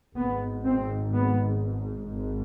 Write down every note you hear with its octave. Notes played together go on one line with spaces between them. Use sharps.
G#1 G#2 B3
C4
B3
G#1 G#2